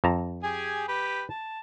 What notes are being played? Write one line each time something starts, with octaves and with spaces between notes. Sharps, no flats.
F2 A5 A#5
G4 G#4 G#5
G4 B4
A5